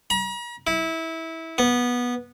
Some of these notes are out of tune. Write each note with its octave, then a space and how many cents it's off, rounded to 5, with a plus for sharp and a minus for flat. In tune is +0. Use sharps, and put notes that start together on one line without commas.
A#5 +45
E4 -20
B3 -15